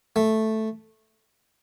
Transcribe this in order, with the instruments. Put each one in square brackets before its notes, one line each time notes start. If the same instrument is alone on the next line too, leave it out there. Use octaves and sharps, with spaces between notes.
[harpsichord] A3